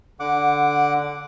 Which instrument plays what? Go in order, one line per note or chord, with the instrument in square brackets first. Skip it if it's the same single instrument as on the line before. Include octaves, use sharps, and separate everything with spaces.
[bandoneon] D3 F#5 D6